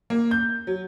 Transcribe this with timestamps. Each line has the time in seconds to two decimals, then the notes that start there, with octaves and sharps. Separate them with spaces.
0.10 A#3
0.31 G6
0.67 F#3